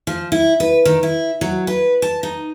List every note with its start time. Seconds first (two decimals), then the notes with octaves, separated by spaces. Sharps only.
0.07 F3
0.32 E4
0.60 B4
0.85 D#3
1.03 E4
1.41 F#3
1.67 B4
2.02 A5
2.23 D#4